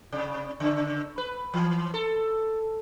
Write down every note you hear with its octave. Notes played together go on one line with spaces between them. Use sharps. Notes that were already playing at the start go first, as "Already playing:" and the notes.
C3
C#3
B4
E3
A4